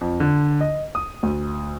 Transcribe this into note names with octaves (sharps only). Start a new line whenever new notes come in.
F2
D3
D#5
D#6
D2